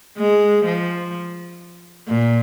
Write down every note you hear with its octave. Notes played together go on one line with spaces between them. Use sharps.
G#3
F3
A#2